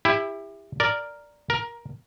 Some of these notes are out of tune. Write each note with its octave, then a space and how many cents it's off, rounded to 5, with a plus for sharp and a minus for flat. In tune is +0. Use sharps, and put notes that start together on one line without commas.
E4 +0 G4 +30
A#4 +0 D5 +0
A#4 +15 A#5 +0